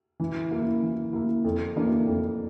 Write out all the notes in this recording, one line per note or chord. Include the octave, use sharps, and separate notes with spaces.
E3
A#3 E4
E3
A#3 E4
F2
E3 A#3 D4
F2